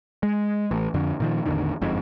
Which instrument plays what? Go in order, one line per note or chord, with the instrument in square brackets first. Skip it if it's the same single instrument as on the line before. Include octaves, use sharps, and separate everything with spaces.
[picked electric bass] G#3
A1
F2 D3
A#2 D#3 F3
A1 E2 D3 D#3
G1 F2 G#2